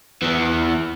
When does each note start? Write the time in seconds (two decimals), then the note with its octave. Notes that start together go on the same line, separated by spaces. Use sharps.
0.22 E2 E3